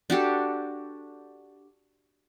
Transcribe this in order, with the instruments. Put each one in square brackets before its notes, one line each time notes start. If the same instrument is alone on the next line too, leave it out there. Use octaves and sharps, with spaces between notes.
[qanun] D4 F#4 G4 A4